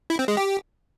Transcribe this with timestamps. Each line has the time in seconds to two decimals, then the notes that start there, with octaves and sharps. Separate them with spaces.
0.10 E4
0.19 C4
0.28 G#3
0.37 G4